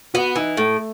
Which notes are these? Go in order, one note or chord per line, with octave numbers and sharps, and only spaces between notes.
B3 F#4
E3 D#4
A2 A3